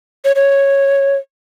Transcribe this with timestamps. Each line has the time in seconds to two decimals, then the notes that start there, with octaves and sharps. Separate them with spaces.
0.25 C#5
0.36 C#5